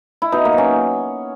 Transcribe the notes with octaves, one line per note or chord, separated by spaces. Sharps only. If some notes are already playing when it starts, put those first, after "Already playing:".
E4
B2 D#4
A#3
F#3
C#4